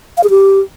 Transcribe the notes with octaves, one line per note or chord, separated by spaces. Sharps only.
F5
G#4
G4